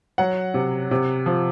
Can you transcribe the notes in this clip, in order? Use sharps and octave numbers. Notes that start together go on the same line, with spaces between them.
F#3 F#5
C3
C3
F3